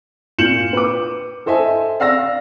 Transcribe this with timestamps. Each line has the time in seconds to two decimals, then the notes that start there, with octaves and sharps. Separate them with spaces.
0.38 A#2 F4 G6 C#7 E7 F#7
0.73 B4 D6
1.46 A4 C5 D#5 E5 G#5
2.00 D5 F5 E6 A#6